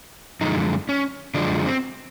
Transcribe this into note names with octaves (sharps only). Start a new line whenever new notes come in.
F#2 D3 F3 G#3 D#4
C#4
F#2 D3 F3 G#3 D4
C4